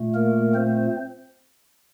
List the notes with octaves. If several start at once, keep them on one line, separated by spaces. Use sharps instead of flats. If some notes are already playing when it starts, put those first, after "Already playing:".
Already playing: A#2 A3
A#3 A#4
C4 C5